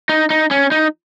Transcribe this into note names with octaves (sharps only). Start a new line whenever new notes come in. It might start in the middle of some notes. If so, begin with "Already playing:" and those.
D#4
D#4
C#4
D#4